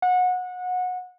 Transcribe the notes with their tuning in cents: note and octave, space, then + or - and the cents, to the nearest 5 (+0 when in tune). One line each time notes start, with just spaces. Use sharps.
F#5 -25